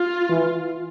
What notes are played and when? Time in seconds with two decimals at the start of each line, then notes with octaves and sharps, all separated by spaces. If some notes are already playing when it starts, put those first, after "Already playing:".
Already playing: F4
0.30 E3